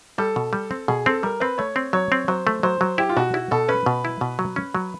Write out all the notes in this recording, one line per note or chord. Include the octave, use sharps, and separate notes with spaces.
G3 A4
B2
G3
C4
B2 G#4
C4 A4
G3 A#4
C4 B4
A3 C#5
C4
F#3 C#5
C4
F#3 C5
A3
F#3 C5
F#3
E4 G4
F4
B2 F#4
E4 F#4
B2 A4
C#4 B4
B2
E4
B2
F#3
C#4
F#3